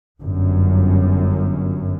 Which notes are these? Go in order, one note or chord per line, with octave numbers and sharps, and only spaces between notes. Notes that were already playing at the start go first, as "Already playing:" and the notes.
G1 F#2